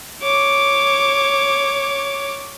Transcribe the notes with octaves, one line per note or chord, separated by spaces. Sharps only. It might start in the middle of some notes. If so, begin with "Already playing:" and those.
C#5 D6